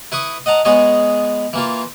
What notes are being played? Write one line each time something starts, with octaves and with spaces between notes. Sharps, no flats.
E4 B4 C#6 D#6
D#5 F#5 A5 A#5
G#3 B3 G#4 C#5 D#5
E3 A#3 F4